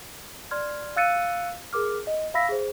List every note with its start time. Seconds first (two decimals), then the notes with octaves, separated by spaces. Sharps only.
0.51 D5 C6 F6 G#6
0.96 F5 E6 F#6 A6 C#7 D#7
1.73 G#4 A#4 D6 F6
2.07 D#5
2.34 E5 F5 B5 E6 A#6 B6
2.49 G#4 C5